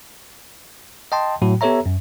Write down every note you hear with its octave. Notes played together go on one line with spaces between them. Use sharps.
D#5 G5 A5 C6
A2 F#3 F#4
B3 G4 A4 C#5 E5 A#5
F#2